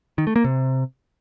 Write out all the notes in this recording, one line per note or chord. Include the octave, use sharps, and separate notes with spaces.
D#3
A3
A#3
C3